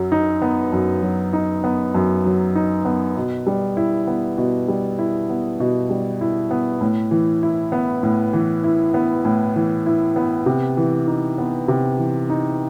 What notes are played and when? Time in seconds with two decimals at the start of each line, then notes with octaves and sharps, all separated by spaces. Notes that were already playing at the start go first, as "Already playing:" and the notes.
Already playing: F#2 F#3
0.12 D#4
0.42 B3
0.72 F#2
1.02 F#3
1.33 D#4
1.64 B3
1.94 F#2
2.25 F#3
2.55 D#4
2.85 B3
3.17 B2
3.47 G3
3.77 E4
4.07 B3
4.38 B2
4.68 G3
4.99 E4
5.30 B3
5.60 B2
5.90 G3
6.21 E4
6.51 B3
6.81 A2
7.11 E3
7.43 E4
7.72 B3
8.03 A2
8.33 E3
8.64 E4
8.94 B3
9.25 A2
9.56 E3
9.86 E4
10.16 B3
10.46 C3
10.77 E3
11.07 D#4
11.38 B3
11.68 C3
11.98 E3
12.30 D#4